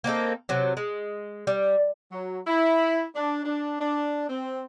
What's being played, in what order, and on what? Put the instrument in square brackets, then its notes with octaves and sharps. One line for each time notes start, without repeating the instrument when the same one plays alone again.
[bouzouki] A#3 C4 D#4 A4
C3 F#3
G#3
G3
[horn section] F#3
E4
D4
D4
D4
C4